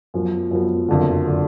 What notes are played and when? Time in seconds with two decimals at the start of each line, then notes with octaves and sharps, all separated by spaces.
0.14 F#2 F3 B3
0.51 F#2 F3 B3
0.88 F#1 F2 D3
1.27 D3